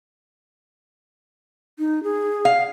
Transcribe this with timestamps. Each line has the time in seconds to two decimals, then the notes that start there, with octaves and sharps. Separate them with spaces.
1.79 D#4
2.03 G#4
2.45 F5